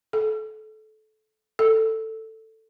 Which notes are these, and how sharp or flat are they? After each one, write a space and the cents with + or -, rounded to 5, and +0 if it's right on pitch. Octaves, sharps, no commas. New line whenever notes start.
A4 -25
A4 +10